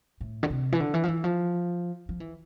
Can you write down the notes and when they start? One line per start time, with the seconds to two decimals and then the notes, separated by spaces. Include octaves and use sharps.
0.21 A2
0.43 D3
0.50 C3
0.72 E3
0.80 D3
0.94 E3
1.04 F3
1.08 E3
1.24 F3
2.09 F3
2.20 E3